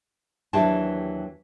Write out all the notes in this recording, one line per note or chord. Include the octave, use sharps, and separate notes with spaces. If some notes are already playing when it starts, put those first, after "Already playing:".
D#2 E3 F#3 D4 G4 A5